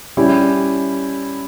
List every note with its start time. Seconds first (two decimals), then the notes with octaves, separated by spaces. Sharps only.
0.17 G3 C#4 E4 G4